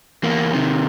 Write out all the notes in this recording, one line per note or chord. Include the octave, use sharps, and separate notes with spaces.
E2 A#3
C3 D#3